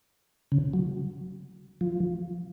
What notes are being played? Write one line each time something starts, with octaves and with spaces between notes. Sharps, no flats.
C#3
F#3
F3